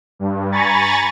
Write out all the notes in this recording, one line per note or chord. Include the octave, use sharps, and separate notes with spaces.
G2
G#5 A#5 B5 C#6 A6